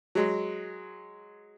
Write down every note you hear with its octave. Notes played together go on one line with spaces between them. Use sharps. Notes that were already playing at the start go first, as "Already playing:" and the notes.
F#3 G#3